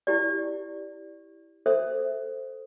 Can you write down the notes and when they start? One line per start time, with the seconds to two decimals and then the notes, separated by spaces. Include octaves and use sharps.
0.07 E4 G4 D5
1.66 A4 C5 E5